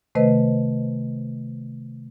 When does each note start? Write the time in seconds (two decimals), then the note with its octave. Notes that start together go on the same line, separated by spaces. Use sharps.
0.15 C3 D#3 A3 B4 C5 D#5